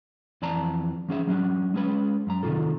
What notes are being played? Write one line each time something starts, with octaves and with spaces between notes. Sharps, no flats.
F2 E3 D5 A5 A#5
F3 C#4 G#4 E5
F#3 C#4 D4
G#3 C#4 B4
F#2 A#5
C3 D#3 E3 D#4 F4 A4